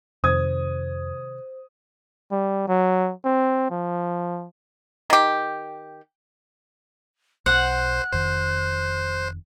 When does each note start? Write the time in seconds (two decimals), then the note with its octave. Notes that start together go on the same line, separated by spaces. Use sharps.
0.24 F2 C3 D#3 C5 D#6 G#6
2.31 G3
2.68 F#3
3.24 C4
3.70 F3
5.10 D#3 G4
7.46 B1 C5 F#5 F#6
8.12 F1 F2 D#3 C5